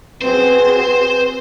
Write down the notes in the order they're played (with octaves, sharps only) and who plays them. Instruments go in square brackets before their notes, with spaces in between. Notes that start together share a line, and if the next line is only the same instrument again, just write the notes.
[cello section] C4 F#4 G#4 [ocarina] B4 [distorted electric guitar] C5